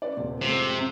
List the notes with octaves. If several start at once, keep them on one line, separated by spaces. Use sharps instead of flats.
C#4 B4 D5
D#1 C3
F2 A2 C3 G#3